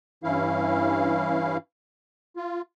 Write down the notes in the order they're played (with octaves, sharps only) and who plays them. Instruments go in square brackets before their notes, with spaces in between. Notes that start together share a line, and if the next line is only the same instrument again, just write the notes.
[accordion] G2 E3 C#4 E4 F5
F4